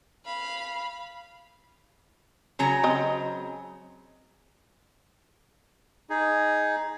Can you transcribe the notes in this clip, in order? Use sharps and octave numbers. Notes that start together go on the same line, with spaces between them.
F5 B5
C#3 F#3 A#5
G#3 C4 D#5
D#4 G#4